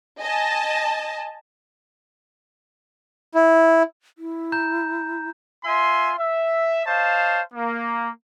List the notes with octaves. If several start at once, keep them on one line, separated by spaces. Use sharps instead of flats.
D#5 G#5 A5
E4
E4
A#5 G6
F4 E5 G#5 C6
E5
C5 C#5 D#5 F5 A5
A#3